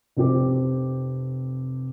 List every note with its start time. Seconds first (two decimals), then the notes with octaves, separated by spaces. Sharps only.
0.17 F1 C4 G4 D6